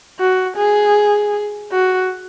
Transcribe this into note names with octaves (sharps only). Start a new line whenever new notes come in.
F#4
G#4
F#4